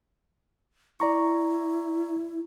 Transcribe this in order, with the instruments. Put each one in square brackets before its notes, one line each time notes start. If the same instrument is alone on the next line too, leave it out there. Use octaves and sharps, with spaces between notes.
[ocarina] E4 [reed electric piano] D5 A#5 C#6